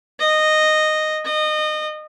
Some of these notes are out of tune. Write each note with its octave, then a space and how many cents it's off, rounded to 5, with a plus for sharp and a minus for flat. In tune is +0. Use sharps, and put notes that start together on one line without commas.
D#5 -10
D#5 -25